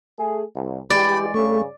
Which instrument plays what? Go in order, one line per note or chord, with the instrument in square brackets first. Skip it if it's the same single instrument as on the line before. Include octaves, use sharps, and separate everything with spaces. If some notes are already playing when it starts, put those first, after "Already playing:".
[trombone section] A3 G#4
C2
[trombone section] E3 G3 G#3 [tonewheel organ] G4 [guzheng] D5 [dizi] B5
[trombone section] G2 C#3 [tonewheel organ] A3 [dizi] C#6